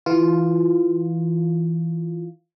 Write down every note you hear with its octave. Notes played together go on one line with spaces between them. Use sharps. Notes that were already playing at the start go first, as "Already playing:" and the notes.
E3 F4